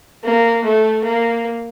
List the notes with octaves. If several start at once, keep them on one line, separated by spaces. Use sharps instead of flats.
A#3
A3
A#3